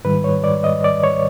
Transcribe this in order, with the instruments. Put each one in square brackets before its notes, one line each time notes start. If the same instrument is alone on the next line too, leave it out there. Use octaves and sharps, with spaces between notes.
[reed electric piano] G#2 D#3 G3 B4
C#5
D5
D#5
D5
C#5